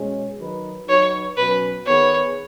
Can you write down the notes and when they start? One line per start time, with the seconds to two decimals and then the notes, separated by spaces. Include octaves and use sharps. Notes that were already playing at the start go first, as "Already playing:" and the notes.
Already playing: B2 G#3 C#4
0.38 D#3 F#3 D#4 B4
0.87 F#3 D#4 F#4 B4 C#5
1.36 B2 F#3 C#4 B4
1.86 D#3 B3 G#4 B4 C#5